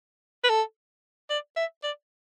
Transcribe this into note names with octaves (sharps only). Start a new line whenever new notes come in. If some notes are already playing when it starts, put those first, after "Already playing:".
B4
A4
D5
E5
D5